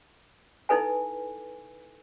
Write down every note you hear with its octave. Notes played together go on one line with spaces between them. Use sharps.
D#4 E4 A4 B4 G#5